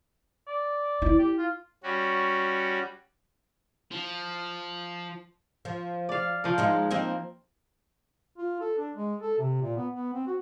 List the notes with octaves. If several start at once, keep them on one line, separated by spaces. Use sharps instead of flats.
D5
D#4 E4
G4
F4
G3 C#4 F#4
F3
F3
D5 F5
F3 A#4
G#3 D#4 F4
A#3 C4 D#4
F4
A4
D4
G#3
A4
C3
A#2
B3
B3
C4
F#4